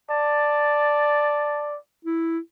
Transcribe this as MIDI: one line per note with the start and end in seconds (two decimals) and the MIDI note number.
0.10 1.78 74
0.10 1.67 81
2.05 2.39 64